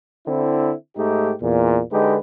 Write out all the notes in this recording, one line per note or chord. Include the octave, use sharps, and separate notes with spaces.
D3 C4 E4
G#2 A3 D#4 G4
E2 A#2
D3 G#3 D#4 G4 B4